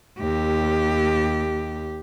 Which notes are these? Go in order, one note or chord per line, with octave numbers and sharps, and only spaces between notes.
D#2 G4